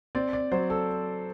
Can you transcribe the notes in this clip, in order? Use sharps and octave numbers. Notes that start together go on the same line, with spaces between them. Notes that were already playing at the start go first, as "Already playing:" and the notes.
C4 D5
D5
F#3 C5
A4